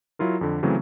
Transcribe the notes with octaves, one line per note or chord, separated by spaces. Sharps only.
F#3 E4 F4 A#4
F2 D3
C#3 E3 F#3 A3 C4